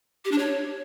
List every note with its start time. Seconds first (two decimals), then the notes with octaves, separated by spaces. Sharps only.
0.25 G4
0.32 D4
0.38 C#5